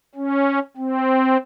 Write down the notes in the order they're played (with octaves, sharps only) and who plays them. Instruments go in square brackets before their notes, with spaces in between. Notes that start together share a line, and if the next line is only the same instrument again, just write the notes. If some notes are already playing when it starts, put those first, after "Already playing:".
[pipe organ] C#4
C4